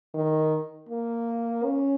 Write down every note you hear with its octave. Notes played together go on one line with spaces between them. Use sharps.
D#3
A#3
C#4